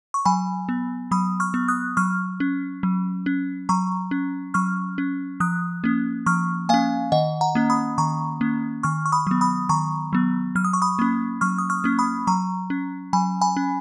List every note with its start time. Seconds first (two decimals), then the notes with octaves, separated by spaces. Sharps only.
0.14 C#6
0.25 F#3 G#5 B5
0.69 B3
1.11 F#3 B5 D#6
1.40 C#6 F6
1.54 B3
1.68 D#6 F#6
1.97 F#3 C#6 F6
2.40 C#4
2.83 F#3
3.26 C#4
3.69 F#3 A#5 C#6
4.11 C#4
4.54 F#3 C#6 F6
4.98 C#4
5.40 F3 D#6 F#6
5.84 A#3 C#4
6.26 F3 C#6 F6
6.69 A#3 C#4 F5 G#5
7.12 D#3 D#5 F#5
7.41 F#5 A#5
7.55 A#3 C#4
7.70 B5 D#6
7.98 D#3 A#5 C#6
8.41 A#3 C#4
8.83 D#3 C#6 F6
9.06 C#6
9.12 B5 D#6
9.27 F#3 B3
9.41 B5 D#6
9.69 D#3 A#5 C#6
10.13 F#3 B3
10.55 F#3 F6
10.65 D#6
10.73 C#6
10.82 B5 D#6
10.99 A#3 C#4
11.41 F#3 C#6 F6
11.58 D#6
11.70 C#6 F6
11.84 A#3 C#4
11.99 B5 D#6
12.27 F#3 A#5 C#6
12.70 C#4
13.13 F#3 G#5 B5
13.41 G#5 B5
13.57 C#4